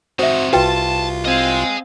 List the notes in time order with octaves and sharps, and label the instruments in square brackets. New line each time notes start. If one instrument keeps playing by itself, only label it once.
[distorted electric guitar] C4 D#4 [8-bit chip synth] F#4 [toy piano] C5 E5
[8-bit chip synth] C2 F4 [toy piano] F#4 B4 G5 [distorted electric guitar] A5
[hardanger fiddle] C4 F5 [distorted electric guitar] D#5 G#5